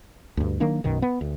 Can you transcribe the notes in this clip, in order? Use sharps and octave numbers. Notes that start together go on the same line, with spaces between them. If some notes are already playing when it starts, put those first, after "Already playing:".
D2 G2
D#3 F#3 A#3 D4
B1 F#2 B2 D#3
B3
D2